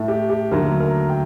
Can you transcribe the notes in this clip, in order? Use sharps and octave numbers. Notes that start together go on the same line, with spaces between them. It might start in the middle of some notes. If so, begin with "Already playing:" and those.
Already playing: A2 A3
G4
G4
D#2 D3 F#3 A3 A#4
A#4
G5